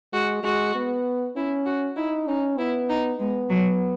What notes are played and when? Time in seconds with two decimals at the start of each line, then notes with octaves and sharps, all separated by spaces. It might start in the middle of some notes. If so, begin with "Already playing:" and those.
0.13 G#3 F#4
0.43 G#3 F#4
0.75 B3
1.36 C#4 E4
1.66 F#4
1.96 D#4 E4
2.27 C#4 D#4
2.58 B3 E4
2.88 D#4
3.19 G#3 B3
3.49 F#3